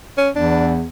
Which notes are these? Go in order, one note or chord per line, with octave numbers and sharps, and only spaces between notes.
C#4
E2 E3 D4